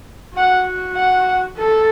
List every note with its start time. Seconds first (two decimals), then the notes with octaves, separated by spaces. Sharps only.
0.36 F#4 F#5
0.96 F#5
1.56 A4